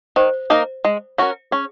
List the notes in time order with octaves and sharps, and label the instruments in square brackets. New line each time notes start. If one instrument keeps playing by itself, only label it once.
[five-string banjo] D#3 [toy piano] C5
[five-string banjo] A#3 D#4 A#4
G#3
C#4 F#4 A#4
[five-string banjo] C#4 [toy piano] G#4